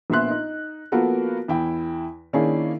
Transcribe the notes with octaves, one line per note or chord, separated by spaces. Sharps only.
A#1 A#2 B3 E5 C6 F#6
D#4
F3 A#3 B3 F#4 A4 A#4
E2 E4 G5
D#3 A#3 C#4 D4 E4 G#4